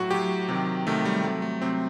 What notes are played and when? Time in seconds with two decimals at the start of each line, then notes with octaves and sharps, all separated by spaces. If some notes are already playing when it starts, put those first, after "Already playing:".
Already playing: A2 F#3 F#4
0.10 A2 F#3 G4
0.49 C3 D#3 F#3
0.87 C3 D#3 F#3 A3
1.05 G3
1.24 C3 F#3 A3
1.42 A3
1.61 C3 F#3 C4